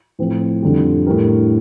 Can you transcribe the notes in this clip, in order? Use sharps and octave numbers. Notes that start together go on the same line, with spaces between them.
A2 F3 C4
F2 D3 G3
A2 G3 D4 G4 A#4